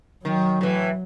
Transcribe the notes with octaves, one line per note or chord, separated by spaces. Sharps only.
D#3 F#3
A2 E3